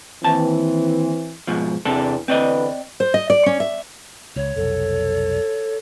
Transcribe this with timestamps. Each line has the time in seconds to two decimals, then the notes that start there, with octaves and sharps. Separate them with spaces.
0.24 D#2 E3 C4 A5
1.47 G#2 B2 F3
1.85 E2 C3 D4 A4
2.28 E2 D3 C4 B4 D5 D#5
3.00 C5
3.14 D#5
3.30 D5
3.46 C#4
3.60 E5
4.36 C#2 C#5
4.56 F1 B1 A4